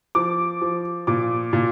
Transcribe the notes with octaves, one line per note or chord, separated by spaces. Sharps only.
F3 D6
F3
A#2 D6
A#2